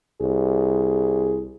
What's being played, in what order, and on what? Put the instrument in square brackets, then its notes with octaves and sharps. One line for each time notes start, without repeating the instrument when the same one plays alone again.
[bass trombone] C2 [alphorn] G#4